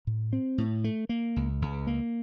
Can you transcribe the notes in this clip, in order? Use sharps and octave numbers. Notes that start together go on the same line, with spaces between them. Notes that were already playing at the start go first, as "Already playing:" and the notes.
A2
C4
A2
A3
A#3
C#2
C#2
A#3